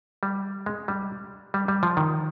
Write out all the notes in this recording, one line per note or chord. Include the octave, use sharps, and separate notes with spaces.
G3
G#3
G3
G3
G3
F3
D#3